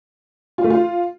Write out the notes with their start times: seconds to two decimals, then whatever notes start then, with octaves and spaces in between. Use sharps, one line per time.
0.58 F4
0.64 A3
0.70 F4